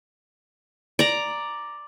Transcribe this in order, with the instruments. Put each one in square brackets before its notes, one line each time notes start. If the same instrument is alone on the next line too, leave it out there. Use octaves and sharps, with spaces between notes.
[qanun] D5 A#5